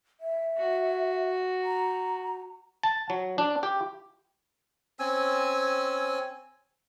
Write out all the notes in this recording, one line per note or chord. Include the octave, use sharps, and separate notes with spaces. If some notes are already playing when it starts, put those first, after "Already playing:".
E5
F#4
A#5
A5
F#3
D4
G4
C4 C#4 G#5 E6